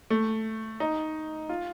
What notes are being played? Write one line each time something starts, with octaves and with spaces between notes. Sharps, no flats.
A3
D#4
F4